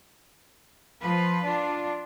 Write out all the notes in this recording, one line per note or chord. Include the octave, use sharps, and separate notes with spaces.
F3 F4 B4
D4 F4